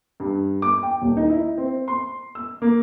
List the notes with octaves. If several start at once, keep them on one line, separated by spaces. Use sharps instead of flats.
G2
D6
G5
D#1
D#4
E4
C4
C6
E6
A#3